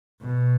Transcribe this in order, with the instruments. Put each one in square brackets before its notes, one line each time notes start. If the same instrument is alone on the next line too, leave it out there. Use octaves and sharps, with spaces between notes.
[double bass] B2